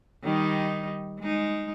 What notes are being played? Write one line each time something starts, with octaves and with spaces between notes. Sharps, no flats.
D#3 G3 D#4
G#3 D#4